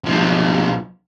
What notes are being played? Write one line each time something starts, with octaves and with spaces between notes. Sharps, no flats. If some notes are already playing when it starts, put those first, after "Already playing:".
B1 F3